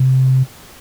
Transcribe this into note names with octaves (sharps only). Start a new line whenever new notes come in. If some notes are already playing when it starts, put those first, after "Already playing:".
Already playing: C3